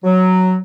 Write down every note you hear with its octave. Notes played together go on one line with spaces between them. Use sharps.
F#3